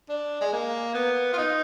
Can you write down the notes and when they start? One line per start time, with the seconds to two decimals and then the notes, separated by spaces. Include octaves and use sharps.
0.09 D4
0.41 G#3
0.53 A#3
0.94 B3
1.33 F4
1.38 D#4